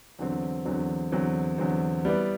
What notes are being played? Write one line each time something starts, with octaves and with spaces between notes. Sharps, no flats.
E2 D3 F#3 C4
E2 D3 F#3 C4
E2 D3 F#3 C4
E2 D3 F#3 C4
G3 B3 E4 B4 D5